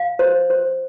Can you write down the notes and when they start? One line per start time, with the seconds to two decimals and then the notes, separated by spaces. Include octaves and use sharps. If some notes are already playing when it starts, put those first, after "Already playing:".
Already playing: F5
0.19 C5
0.50 C5